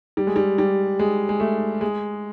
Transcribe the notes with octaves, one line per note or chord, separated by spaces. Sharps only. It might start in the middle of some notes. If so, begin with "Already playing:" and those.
G3
G#3
G3
G3
G#3
G#3
A3
G#3